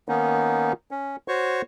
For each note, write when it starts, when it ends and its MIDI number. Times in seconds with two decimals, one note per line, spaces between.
0.09 0.73 51
0.09 0.73 58
0.09 0.73 59
0.09 0.73 61
0.09 0.73 63
0.91 1.16 61
1.28 1.62 66
1.28 1.62 72
1.28 1.62 73
1.28 1.62 85